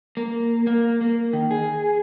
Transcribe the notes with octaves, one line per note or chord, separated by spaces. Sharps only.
A#3
A#3
A#3
D#3
G#4